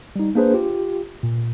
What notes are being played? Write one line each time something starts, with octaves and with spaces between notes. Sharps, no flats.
G3 D#4
A#3 D4 G#4 B4 C5
F4 G4
A#2